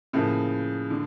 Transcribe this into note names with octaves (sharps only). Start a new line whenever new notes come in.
A2 C#3 F3 A#3
D3